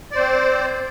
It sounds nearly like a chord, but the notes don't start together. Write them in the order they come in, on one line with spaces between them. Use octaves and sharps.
D5 C5 C4